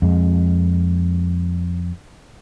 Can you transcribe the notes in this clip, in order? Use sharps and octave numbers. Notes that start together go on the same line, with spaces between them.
F2 G#3